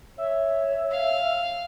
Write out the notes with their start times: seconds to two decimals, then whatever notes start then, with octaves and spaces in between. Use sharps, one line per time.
0.18 C#5 E5
0.91 F5